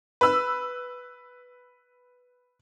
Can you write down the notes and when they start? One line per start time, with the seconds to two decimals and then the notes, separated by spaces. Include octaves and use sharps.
0.21 B4 E6